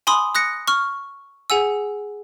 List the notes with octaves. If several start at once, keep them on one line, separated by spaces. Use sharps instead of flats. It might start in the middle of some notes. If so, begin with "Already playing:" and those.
G#5 B5 C6 D#6
D#6 F#6 A#6 C#7
C#6 F6
G#4 F#5 G#5 E6